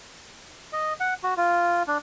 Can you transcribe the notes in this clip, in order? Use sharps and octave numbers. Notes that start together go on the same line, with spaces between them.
D#5
F#5
F#4
F4
D4